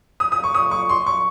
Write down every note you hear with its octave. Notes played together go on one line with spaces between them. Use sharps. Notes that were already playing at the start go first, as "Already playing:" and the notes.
D#6
D#6
C#6
D#6
C#6
C6
C#6